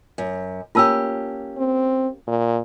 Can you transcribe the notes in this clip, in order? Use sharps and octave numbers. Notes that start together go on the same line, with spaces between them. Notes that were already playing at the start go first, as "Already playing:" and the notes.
F#2
A#3 C#4 F4 G4 A5 E6
C4
A#2